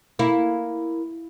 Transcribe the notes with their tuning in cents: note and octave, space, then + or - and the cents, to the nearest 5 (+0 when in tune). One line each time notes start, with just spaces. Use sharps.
A#3 +0 E4 +0